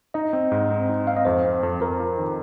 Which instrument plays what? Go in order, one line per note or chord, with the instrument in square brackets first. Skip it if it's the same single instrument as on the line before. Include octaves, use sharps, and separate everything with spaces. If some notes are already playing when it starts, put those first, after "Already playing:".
[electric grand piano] D#4 [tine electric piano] D#5
[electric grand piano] C4
G#2
C4
D#4
[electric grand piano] C4 [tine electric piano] F5
[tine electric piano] D#5
[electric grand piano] F2 [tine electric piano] C5
[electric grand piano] C4
F2
[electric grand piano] F2 [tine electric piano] A#4
[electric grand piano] F4
D#3